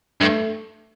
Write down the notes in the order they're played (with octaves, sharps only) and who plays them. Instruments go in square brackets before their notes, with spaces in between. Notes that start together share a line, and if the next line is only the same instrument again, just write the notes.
[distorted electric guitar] G2 [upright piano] A3